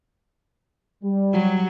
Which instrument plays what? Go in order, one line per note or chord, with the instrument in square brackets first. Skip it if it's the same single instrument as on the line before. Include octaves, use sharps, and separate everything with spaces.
[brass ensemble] G3
[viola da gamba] F#3